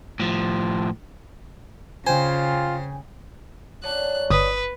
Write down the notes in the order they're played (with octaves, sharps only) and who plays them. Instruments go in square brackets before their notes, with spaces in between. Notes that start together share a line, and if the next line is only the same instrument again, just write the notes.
[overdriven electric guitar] A2 F3
[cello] C#3 [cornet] F4 [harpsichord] C5 [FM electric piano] G5 G#5
[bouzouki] F#3 C#4 D4 [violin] F#6
[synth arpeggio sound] G1 [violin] B4 [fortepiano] D#6